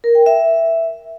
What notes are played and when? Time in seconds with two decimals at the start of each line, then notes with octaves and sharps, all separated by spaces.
0.04 A#4
0.15 G5
0.26 E5